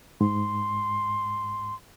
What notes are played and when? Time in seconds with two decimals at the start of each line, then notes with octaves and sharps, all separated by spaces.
0.21 G#2 C6